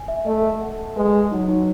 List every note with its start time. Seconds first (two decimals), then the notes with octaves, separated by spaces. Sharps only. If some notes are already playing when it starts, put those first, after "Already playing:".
Already playing: G#5
0.08 E5
0.26 A3 D#5
0.43 A4
0.61 F#5
0.78 A5
0.96 G#3 B4
1.13 D#5
1.31 F#3 D#4
1.48 D#4